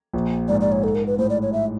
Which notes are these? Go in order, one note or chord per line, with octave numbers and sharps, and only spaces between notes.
A#1 A#2
G#2 D5
D5
C#5
A4
A#4
B4
A2 C5
D5
C#5
E5